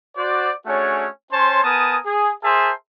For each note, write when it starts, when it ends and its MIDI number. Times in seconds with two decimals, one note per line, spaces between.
0.17 0.51 66
0.17 0.51 72
0.17 0.51 74
0.67 1.06 57
0.67 1.06 61
0.67 1.06 62
0.67 1.06 66
0.67 1.06 68
0.67 1.06 73
1.32 1.60 61
1.32 1.60 72
1.32 1.60 73
1.32 1.60 81
1.32 1.60 84
1.64 1.98 59
1.64 1.98 70
1.64 1.98 80
1.64 1.98 81
1.64 1.98 87
2.06 2.31 68
2.43 2.71 68
2.43 2.71 70
2.43 2.71 72
2.43 2.71 76
2.43 2.71 81
2.43 2.71 84